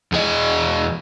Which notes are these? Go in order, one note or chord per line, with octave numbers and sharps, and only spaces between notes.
E2 G#4 D#5